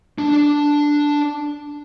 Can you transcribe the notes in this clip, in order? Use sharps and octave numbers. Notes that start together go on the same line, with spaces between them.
D4 A5